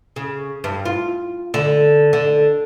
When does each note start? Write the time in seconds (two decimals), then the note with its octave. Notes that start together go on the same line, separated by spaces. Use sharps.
0.16 C#3
0.64 G2
0.85 F4
1.54 D3
2.13 D3